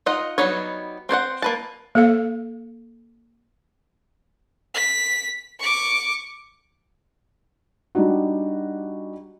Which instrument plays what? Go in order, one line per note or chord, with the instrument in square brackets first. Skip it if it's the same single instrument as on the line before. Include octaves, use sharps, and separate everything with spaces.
[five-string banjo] D#4 F4 D#5 F#5
F#3 G3 B3 D#4 C#5
C4 C5 C#5 F#5
A#3 B4 A5
[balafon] A#3 A4 F5
[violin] B6
C#6 D6
[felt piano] G3 D4 D#4 F#4